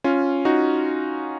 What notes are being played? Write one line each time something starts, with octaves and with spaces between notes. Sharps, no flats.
C#4 F4
D#4 F#4